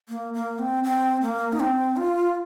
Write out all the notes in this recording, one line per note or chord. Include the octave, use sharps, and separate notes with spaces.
A#3
A#3
C4
C4
A#3
D#4
C4
F4